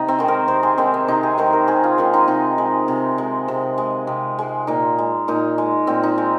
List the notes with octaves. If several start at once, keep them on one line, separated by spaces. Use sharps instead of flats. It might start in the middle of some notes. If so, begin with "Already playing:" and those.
Already playing: C3 D#4
C4
D#3 G#3
A#4
C3 C5
G#4
D#3 G#3 C4
C4
C3 D#4
G#4
D#3 G#3 C5
A#4
C3 G#4
F4
D#3 G#3
D#4
C3 D#4
G#3
C3
G#3
C3
G#3
C3
G#3
A#2 D#4
G#3
A#2 D#4
G#3
A#2 C4
D#4
G#3